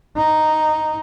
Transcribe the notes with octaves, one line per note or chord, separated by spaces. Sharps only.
D#4